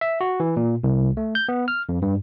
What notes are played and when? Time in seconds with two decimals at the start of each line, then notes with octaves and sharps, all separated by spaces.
0.01 E5
0.21 F#4
0.40 E3
0.57 A#2
0.84 C2
1.17 A3
1.35 G6
1.49 B3
1.68 F6
1.89 F2
2.02 G2